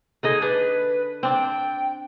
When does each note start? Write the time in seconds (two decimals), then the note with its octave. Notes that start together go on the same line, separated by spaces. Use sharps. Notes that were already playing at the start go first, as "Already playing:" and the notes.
0.23 D3 D#4 G#4 D#5
0.42 D4 B4
1.23 C4 D4 G5